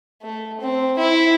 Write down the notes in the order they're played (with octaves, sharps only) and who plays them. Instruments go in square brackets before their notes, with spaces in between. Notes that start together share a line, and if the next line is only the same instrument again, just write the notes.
[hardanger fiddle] A3
C4
E4